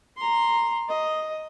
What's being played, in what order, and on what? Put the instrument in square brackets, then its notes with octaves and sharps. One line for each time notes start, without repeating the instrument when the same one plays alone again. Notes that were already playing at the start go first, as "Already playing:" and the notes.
[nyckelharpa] A#5 C6
D#5